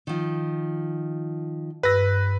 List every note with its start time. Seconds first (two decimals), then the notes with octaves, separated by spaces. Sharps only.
0.07 D#3 F3
1.83 G2 B4 E6 A#6